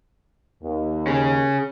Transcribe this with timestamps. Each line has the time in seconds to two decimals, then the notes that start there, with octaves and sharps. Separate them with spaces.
0.63 D#2
1.07 C#4 G#4